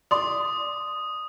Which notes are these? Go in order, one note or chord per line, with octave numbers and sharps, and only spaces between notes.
D5 C6 D#6